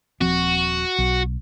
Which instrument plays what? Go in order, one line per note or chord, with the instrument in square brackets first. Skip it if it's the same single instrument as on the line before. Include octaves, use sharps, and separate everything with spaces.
[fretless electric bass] D#1 F3 C4 [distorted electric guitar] F#4
[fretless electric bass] B1